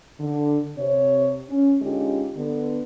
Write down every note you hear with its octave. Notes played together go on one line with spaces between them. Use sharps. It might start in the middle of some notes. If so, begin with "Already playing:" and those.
D3
C3 C#5
C#4
D3 G#3 C#4 D#4 F4 G4
D3 B3